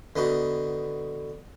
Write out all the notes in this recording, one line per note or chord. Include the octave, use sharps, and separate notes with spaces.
D3 B3 D#4 F#4